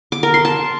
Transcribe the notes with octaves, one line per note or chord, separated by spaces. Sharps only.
D6
A#4
C6
A5